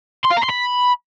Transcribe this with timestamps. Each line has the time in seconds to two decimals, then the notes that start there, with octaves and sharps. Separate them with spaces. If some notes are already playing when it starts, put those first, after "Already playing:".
0.24 C6
0.30 F5
0.37 A#5
0.43 C6
0.49 B5